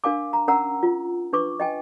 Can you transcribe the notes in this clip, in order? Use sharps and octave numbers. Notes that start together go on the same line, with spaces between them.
D4 A#4 F5 G#5 D6
A#5
C#4 A#4 F#5 A#5 E6
F4
D4 B4 C#6 D6
D#5 G5 G#5